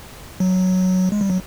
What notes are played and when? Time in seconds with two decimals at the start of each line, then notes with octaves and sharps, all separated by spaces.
0.40 F#3
1.12 G#3
1.21 G3
1.30 F#3